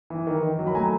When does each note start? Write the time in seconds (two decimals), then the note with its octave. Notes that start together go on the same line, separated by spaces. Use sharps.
0.10 E3
0.27 D#3
0.43 D#3
0.59 F#3
0.67 B5
0.75 A3 G#5 A#5